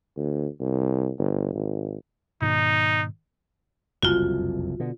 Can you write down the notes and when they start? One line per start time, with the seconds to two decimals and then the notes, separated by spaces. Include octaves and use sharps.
0.16 D2
0.60 C2
1.18 G1
1.54 G#1
2.42 G#2 B2 D#3 D#4
4.03 F#1 C2 F2 F4 F#4
4.80 B2 D3